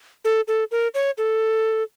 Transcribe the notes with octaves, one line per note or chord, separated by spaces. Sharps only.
A4
A4
A#4
C#5
A4